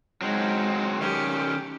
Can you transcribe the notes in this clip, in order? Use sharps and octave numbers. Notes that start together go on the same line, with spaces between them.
F#3 G#3 C4 D#4 G#4
D#3 C#4 G4